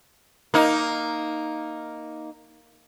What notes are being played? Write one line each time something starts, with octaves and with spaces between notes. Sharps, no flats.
A#3 D#4